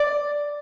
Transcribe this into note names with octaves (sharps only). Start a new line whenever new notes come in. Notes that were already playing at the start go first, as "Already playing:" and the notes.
Already playing: D5